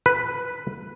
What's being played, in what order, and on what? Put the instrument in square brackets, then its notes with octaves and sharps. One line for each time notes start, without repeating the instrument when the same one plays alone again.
[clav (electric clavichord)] B4